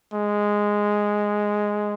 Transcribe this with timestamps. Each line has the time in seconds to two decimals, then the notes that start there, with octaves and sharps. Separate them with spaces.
0.14 G#3